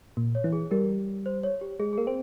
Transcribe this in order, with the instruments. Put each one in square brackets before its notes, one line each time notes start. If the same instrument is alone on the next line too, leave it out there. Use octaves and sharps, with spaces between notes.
[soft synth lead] A#2
[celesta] C#5
[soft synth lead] E3
[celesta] G#4
[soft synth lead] G3 [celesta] A#4
[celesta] C5
C#5
G4
[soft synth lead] G#3 [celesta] G#4
[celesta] G#4
[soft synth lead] A#3 [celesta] A#4
[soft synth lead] C4